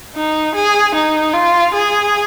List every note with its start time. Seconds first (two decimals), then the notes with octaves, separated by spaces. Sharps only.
0.15 D#4
0.55 G#4
0.95 D#4
1.34 F4
1.74 G#4